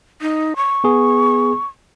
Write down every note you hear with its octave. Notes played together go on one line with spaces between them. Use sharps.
D#4
C#6
B3 G#4